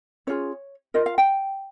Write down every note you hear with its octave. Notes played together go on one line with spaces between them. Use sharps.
C#4 F4 G#4 C#5
F4 A#4 D#5
F5
G5